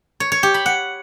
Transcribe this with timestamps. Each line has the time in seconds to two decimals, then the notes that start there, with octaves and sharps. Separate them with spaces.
0.20 C#5
0.32 C#5
0.43 G4
0.54 B5
0.66 F#5